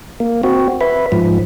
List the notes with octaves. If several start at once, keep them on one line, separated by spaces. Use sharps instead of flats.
A#3
C4 F#4
B4 E5
G#2 F3